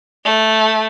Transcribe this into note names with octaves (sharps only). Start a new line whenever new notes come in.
A3